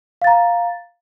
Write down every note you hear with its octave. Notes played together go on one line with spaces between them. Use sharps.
F5 A#5 A6